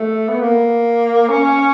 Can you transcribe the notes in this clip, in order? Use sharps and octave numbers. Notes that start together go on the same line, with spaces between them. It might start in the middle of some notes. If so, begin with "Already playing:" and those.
Already playing: A3
B3
A#3
C#4